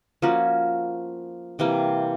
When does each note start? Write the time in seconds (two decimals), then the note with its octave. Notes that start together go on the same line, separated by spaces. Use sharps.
0.22 F3 A#3 C#4 F#4
1.59 C3 E3 G3 A#3